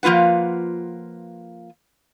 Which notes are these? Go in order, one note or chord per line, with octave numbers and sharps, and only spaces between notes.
F3 A#3 F4 B4 F#5